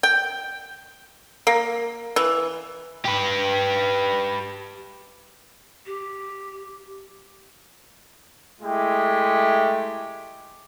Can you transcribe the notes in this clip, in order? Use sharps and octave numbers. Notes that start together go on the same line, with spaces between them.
G5
A#3
E3
G4 B4
G4
G#3 A3 E4 G4